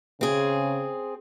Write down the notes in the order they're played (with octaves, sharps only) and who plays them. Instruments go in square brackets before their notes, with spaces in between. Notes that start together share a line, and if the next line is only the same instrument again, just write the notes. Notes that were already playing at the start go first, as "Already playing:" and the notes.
[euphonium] C#3 [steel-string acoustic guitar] C4 G#4